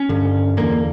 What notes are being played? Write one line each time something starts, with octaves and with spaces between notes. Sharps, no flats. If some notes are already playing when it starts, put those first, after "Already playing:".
Already playing: C#4
G2 D3
E2 D3 A#3